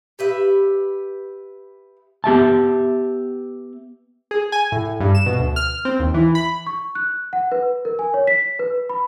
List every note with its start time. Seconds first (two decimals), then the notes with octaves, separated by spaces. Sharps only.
0.19 G4 B4 E5
2.24 B3 G4 E5 A5
4.31 G#4
4.52 G#5
4.72 A2
5.00 G2
5.15 E7
5.26 B2
5.39 D2
5.56 F6
5.85 C4
6.00 D#2
6.14 E3
6.35 B5
6.67 C#6
6.95 F#6
7.33 F#5
7.52 B4
7.85 A#4
7.99 G#5
8.14 C#5
8.27 B6
8.59 B4
8.89 B5